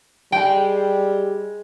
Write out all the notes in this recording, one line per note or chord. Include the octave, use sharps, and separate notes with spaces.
G3 G#3 G5